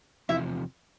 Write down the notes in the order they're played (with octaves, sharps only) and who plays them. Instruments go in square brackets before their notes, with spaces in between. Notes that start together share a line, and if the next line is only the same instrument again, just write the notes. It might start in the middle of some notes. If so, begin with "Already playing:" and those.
[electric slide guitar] E2 C3 F3 [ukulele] E4 E5